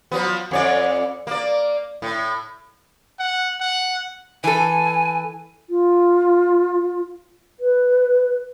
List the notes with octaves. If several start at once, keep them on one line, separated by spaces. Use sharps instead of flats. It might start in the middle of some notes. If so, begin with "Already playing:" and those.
F3 F#3 B3
F2 C#5 D5
A#3 D5
A2
F#5
F#5
E3 A4 G#5
F4
B4